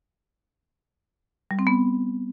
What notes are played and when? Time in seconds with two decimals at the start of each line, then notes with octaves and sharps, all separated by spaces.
1.51 G3
1.59 C4
1.67 B3